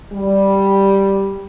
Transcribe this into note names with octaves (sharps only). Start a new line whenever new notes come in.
G3